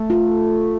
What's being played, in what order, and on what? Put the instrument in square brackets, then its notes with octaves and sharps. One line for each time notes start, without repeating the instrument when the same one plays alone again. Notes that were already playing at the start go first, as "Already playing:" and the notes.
Already playing: [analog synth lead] A3
[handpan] F4